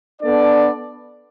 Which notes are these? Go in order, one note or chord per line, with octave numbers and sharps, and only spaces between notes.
B3 D4 A4 D5